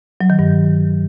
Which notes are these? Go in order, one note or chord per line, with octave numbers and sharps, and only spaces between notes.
F#3
D#3
G2